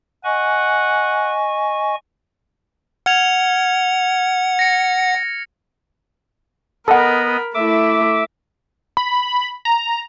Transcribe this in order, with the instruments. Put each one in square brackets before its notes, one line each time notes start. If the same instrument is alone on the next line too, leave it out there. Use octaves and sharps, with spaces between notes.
[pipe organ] D#5 G#5 C#6 [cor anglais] F#5
[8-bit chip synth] F#5 [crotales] F6 G#6 F7
[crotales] A#6 C#7
[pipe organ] B3 D#5 [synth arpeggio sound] A4 F#5 [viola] A#4 B5
[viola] A3 E4 [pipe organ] E5 D6
[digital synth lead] B5
A#5